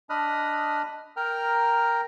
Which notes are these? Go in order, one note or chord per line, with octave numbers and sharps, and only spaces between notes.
D4 D#5 B5 D#6 F6 F#6
A#4 G5 A#5 F6